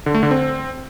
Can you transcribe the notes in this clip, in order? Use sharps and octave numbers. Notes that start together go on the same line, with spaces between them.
D3
A3
D3
C4